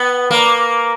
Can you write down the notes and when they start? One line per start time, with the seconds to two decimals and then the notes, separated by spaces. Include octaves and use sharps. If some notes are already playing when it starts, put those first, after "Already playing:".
Already playing: B3
0.31 A#3